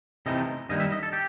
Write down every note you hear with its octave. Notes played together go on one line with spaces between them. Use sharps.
C3 E3 A3 C4 D#4 D#5
G2 D#3 G3 A#3 D#4 D#5
E5
D#5
A4
G4